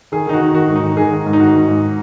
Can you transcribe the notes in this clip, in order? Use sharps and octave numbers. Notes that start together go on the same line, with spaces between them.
D#3 G#4
D#3 D#4
F#4
D#3
D#3 F#4
G#2
D#4
D#3
D#3 G#4
D#3
G#2
D#4
D#3 F#4
G#2
G#2